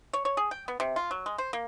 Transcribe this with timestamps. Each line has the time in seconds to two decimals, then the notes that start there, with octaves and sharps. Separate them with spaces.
0.13 C#5
0.25 C#5
0.37 G#4
0.51 G5
0.68 B3
0.80 C3
0.96 F4
1.11 F#3
1.26 G#3
1.38 C5
1.53 A#3